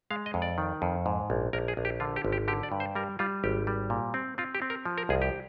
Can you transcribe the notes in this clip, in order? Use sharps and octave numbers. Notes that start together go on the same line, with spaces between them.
G#3 F5
D#5
F2
D5
D#3
F2
G#2
A#1
A#1 A#4
G#4
A#1
G4
D3 F4
G4
G#1
G4
D3 G4
D5
G2
C5
G3 A#4
G3 F4
G#1 G4
G3
A#2
C4
C4 F4
G4
C4
A#4
F3
A#4
C2 G#4
G4